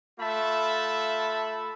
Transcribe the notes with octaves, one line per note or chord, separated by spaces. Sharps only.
A3 F4 E5 A5 B5